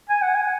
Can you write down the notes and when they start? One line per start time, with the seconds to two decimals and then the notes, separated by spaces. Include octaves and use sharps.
0.09 G#5
0.22 F#5
0.35 G#5